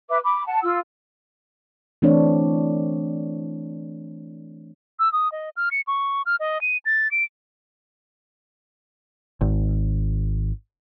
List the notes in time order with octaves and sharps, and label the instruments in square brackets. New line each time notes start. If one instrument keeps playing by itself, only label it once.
[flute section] B4 E5 D6
B5 D6
F#5 A5
F4 E6
[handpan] E3 A3 C4 D4 E4 C#5
[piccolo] E6
D#6
D#5
F6
C#7
C#6
F6
D#5
D#7
A6
D7
[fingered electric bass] G#1